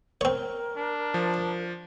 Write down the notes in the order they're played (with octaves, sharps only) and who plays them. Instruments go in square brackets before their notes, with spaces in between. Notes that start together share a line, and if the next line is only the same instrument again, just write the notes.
[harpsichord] C4 C#5 [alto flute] A#4
[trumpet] D4
[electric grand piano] F3